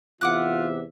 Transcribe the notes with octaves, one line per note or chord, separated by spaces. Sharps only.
E2 C3 F4 E5 F#5 D6 F#6